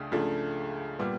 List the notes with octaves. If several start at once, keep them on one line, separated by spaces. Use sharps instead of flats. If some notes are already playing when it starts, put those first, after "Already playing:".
Already playing: C#2 C#3 A3 D4
C#2 C#3 F3 A3 D4
A#2 G3 B3